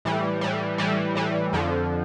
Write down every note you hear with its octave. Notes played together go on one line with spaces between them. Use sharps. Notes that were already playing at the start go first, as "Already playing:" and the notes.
A2 E3 G3
A2 E3 G3
A2 E3 G3
A2 E3 G3
F2 D3 F3